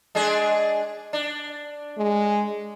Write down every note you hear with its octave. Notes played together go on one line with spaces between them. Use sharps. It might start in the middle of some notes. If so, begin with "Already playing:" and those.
G#3 D4 G#4
D4
G#3